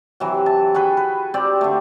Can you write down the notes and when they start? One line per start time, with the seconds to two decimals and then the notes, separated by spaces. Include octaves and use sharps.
0.20 C3 E3 F#3
0.46 A5
0.74 F#4 G#4 B4 G5
0.97 B4
1.34 C4 G4 D5
1.61 D3 A3